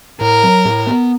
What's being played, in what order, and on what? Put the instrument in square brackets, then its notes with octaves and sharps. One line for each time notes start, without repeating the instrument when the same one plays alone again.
[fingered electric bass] A2 [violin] A#4
[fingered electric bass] F#3
A2
B3